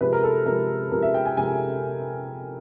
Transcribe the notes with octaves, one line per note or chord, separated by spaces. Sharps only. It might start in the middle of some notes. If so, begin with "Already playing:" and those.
C3 F3 G#3 B4
A#4
A4
C3 F3 G#3 A#4
C3 F3 G#3 A#4
E5
G5
G#5
C3 F3 G#3 G#5